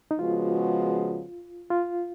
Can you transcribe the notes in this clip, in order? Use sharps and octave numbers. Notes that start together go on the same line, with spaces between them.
D#4
C#3 F3 G#3 B3 F4 F#4
F4